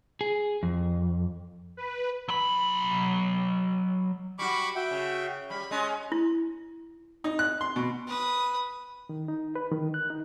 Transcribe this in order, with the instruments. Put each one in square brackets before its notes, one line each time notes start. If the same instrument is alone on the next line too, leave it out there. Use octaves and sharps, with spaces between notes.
[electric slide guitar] G#4
F2
[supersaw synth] B4
[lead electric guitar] F#3 B5
[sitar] G3 F#4 [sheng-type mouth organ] B5 C#6 D6
[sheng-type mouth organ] F#4 E5 G5
[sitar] C#3
[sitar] G3 [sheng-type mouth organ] B5
[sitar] G#3 C#4 [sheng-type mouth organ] D#5 D#6
[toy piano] E4
[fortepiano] D#4
F#6
C6
B2
[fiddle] B4 D#6
[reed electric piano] D#3
D#4
B4
D#3
F#6
D#4